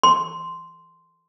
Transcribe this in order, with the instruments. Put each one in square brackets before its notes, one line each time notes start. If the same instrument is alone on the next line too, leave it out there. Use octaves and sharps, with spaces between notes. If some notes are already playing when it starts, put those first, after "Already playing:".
[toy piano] C6